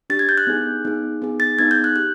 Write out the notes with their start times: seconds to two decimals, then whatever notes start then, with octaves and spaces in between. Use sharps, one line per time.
0.10 D4 G4 A6
0.19 G#6
0.29 G6
0.38 F#6
0.47 B3 D#4 G#4
0.85 B3 D#4 G#4
1.22 B3 D#4 G#4
1.40 A6
1.59 B3 D#4 G#4 G#6
1.71 G6
1.84 F#6
1.96 G4 F#6